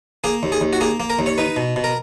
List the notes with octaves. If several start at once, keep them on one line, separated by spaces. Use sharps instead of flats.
A#3 G#4
D#2
G#4
D#2
F#4
A#3 G#4
A#3
A#4
D#2
C#5
D#4 B4
B2
B2
A#4